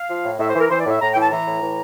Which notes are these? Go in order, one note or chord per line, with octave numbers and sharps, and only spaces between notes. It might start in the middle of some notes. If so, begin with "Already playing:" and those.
Already playing: F5
F3
A2
A2 E5
C5
E3 A#4
E3 C5
D5
A2 E5
A2 A#5
E3 G5
A5
E3 A#5
A2
E3